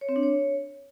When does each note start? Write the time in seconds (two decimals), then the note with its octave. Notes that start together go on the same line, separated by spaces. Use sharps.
0.01 C#5
0.09 C4
0.16 D4
0.23 C#5